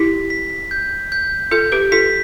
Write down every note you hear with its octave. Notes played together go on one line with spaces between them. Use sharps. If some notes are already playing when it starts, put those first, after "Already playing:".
Already playing: E4 G4 B6
B6
G6
G6
F4 A4 G6
G4 B4
F4 A4 B6